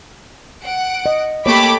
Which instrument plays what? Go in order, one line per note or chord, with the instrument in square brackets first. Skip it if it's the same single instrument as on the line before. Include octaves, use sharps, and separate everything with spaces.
[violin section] F#5 D7
[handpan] D#5
[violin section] A3 G4 [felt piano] A#3 [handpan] C#5 [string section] B5 D6